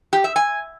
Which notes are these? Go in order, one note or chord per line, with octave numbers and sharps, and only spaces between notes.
G4
E5
G#5